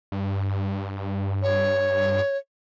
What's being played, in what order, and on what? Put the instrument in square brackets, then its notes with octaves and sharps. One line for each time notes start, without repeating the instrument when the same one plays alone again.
[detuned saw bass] G2
[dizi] C#5